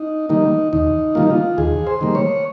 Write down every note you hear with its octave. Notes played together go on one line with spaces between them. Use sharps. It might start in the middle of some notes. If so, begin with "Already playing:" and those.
Already playing: D#4
D#3 G3 A#3 D#4
D#2 D#4
D#3 G3 A#3 F4
D#4
F4
D#2 G#4
C5
D#3 G3 A#3
C#5